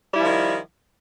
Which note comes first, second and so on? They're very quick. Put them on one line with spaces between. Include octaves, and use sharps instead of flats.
G3 E4 F3 D#3